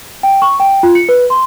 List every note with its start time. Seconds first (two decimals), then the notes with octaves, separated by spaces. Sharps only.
0.23 G5
0.42 C#6
0.60 G5
0.83 F4
0.95 C#7
1.09 B4
1.30 C6